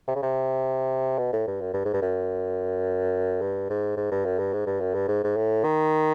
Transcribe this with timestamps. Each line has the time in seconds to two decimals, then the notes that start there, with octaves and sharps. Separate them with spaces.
0.08 C3
0.15 C#3
0.23 C3
1.18 B2
1.33 A2
1.47 G2
1.61 F#2
1.74 G2
1.85 G#2
1.93 G2
2.02 F#2
3.41 G2
3.70 G#2
3.97 G#2
4.11 G2
4.25 F#2
4.39 G2
4.53 G#2
4.66 G2
4.80 F#2
4.94 G2
5.08 G#2
5.24 G#2
5.36 A2
5.64 D#3